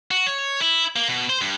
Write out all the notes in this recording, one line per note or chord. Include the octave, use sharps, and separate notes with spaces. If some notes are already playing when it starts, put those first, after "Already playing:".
F#4
C#5
E4
A#3
B2
C5
G2